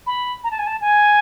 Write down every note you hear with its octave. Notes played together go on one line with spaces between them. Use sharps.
B5
A#5
A5
G#5
A5
G#5